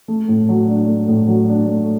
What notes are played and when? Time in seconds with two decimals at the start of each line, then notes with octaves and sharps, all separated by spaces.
0.08 A3
0.28 A2
0.49 F#3
0.68 D4
0.88 A3
1.08 A2
1.27 F#3
1.48 D4
1.67 A3